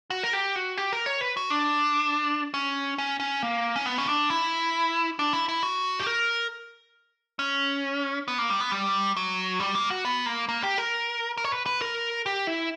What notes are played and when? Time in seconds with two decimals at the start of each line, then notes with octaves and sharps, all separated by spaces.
0.10 F#4
0.23 A#4
0.33 G4
0.56 F#4
0.78 G4
0.93 A#4
1.06 C#5
1.21 B4
1.37 F#4
1.50 D4
2.54 C#4
2.98 C#4
3.20 C#4
3.43 A#3
3.76 C#4
3.86 B3
3.98 C#4
4.09 D4
4.30 E4
5.19 D4
5.33 E4
5.49 E4
5.63 F#4
5.99 G4
6.06 A#4
7.39 C#4
8.28 B3
8.38 A#3
8.50 G3
8.60 B3
8.71 G3
9.17 F#3
9.60 G3
9.75 A#3
9.90 F#4
10.05 B3
10.26 A#3
10.49 A#3
10.63 G4
10.78 A#4
11.37 A#4
11.44 C#5
11.52 B4
11.66 B4
11.81 A#4
12.26 G4
12.47 E4